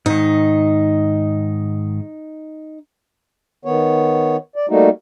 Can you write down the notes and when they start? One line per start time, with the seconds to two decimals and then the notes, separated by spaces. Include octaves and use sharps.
0.06 G#2 D#3 D#4
3.65 D#3 B3 C#5
4.56 D5
4.70 G3 A3 A#3 D#4 F#4